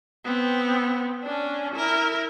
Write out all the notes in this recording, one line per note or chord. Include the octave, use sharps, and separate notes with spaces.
B3 C4
C#4 D4
E4 A#4